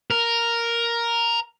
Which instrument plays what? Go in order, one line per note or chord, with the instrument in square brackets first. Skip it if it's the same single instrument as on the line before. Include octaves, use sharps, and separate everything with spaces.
[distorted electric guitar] A#4